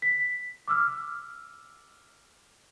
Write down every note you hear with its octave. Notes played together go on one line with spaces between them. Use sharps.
B6
D6 E6 F6